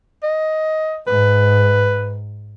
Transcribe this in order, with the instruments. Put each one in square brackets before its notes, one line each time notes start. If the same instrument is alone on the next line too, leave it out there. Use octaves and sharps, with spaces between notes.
[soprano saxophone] D#5
[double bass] G#2 [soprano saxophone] B4